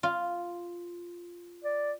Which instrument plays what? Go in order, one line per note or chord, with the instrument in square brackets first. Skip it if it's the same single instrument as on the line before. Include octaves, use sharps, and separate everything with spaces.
[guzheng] F4
[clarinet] D5